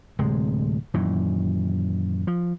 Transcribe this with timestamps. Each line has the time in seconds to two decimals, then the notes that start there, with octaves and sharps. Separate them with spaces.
0.19 D1 C3 G#3
0.94 F#2 A#2 D#3 E3
2.27 F3